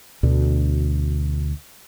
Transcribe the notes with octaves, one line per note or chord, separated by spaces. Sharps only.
D2 B2 D3